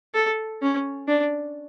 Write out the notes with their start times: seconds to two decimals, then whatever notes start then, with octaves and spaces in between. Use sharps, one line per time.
0.14 A4
0.62 C#4
1.08 D4